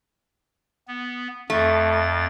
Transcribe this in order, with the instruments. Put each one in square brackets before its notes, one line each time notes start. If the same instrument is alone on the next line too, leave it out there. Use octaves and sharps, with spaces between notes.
[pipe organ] B3
[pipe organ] F2 A6 [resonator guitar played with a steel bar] A3